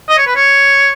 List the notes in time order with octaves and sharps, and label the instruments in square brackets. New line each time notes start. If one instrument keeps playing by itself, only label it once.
[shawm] D#5
C#5
B4
C#5